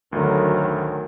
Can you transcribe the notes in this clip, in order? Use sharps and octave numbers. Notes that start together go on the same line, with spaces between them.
D2 D3 D#3 F#3